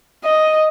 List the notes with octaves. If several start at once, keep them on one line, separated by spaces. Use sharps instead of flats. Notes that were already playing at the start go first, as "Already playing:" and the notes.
D#5